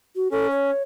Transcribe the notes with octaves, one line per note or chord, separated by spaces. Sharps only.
F#4
C#4 A4
C#5